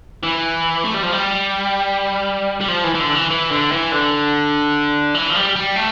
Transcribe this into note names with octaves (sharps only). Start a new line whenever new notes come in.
E3
A3
G3
F3
G3
G3
F3
E3
E3
D3
E3
E3
D3
E3
D3
E3
F3
G3
G3
A3